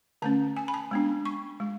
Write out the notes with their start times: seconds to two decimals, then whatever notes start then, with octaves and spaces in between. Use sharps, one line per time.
0.22 D3 A3 C#4 A5
0.57 G#5
0.68 B5
0.74 A5
0.91 G#3 B3 D4
1.26 C#6
1.60 G#3